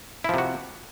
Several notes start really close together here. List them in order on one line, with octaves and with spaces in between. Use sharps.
E4 F3 C3 F#4